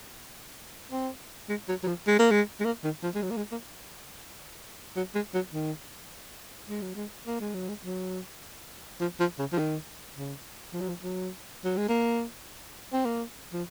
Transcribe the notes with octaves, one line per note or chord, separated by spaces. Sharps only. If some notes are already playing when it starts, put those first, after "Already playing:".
C4
G#3
F#3
F#3
F3
G#3
A#3
G#3
G#3
A#3
D#3
F3
G#3
F#3
A#3
G#3
A#3
F#3
G#3
F#3
D#3
G#3
F#3
G#3
A#3
G#3
F#3
G#3
F#3
F3
F3
C#3
F3
D#3
C#3
F3
F#3
F3
F#3
F#3
G#3
A#3
C4
A#3
F3